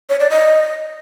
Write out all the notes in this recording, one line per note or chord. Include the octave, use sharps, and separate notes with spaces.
C#5
D5
D#5